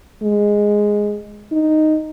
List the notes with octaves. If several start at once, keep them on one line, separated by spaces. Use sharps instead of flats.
G#3
D#4